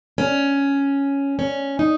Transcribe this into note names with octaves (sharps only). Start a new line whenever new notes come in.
C#4
C#4
D#4